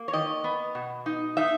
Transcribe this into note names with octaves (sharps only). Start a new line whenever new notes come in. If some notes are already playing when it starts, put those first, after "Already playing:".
Already playing: A#3
C#5
D#3 D#5
B3
B2
D#4
D#4 E5